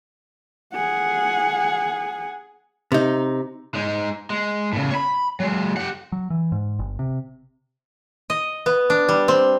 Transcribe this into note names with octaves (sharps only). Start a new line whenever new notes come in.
G#4 F#5
C3 D#4
G#3 D#4
G#3
A2 C#3
C#5 B5
F#3 G#3
G4 F#5
F#3
E3
G#2
G1
C3
D#5
B3
D4
G3
C4